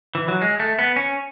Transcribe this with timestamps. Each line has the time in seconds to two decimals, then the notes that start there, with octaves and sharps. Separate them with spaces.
0.15 E3
0.28 F#3
0.42 G#3
0.60 A3
0.79 B3
0.96 C#4